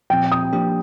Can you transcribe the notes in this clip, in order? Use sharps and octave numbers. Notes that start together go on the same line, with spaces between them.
A#2 F3 C4 G5
D#6
F3 A#3 D4 G4